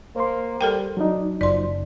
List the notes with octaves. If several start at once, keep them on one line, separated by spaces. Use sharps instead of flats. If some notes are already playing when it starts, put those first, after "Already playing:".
A#3 C5 C6
G3 A4 A#4 G5
F#3 D4 D#4
F#1 F3 D5 C6